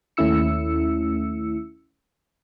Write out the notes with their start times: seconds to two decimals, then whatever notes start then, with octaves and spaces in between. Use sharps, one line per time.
0.17 D#2 A3 C#4 E4 E6 C#7